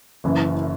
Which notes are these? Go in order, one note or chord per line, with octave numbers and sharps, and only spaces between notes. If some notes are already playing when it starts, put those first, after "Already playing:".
F#1 F#2 E3